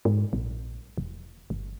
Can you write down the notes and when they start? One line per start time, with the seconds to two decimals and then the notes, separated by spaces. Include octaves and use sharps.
0.05 G#2
0.33 A#1
0.98 E1
1.50 G1